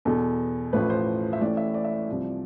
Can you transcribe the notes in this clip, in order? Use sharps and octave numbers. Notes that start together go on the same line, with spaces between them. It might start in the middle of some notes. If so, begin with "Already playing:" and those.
E2 B2 A4
A1 A2 F3 B4
C5
E5
A1 A2 E3 D5
E5
D5
E5
D5
C2 C3 F3